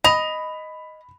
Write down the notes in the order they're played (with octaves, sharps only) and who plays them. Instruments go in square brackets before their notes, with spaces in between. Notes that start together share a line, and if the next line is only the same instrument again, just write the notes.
[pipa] D#5 [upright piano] B5 F7